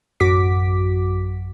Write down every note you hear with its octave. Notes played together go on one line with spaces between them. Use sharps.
A1 F#2 F#4 D6 B6